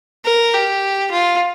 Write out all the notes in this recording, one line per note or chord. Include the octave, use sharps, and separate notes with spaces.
A#4
G4
F4